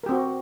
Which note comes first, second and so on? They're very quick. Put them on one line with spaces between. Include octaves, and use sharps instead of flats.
A#4 G4 C4 F#4